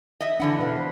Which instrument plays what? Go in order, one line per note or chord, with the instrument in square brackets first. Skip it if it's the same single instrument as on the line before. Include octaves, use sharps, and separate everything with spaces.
[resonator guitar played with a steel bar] D#5 E5
[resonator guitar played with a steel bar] D3 E3 F#5 [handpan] D4
[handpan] B2 B4 F5
C5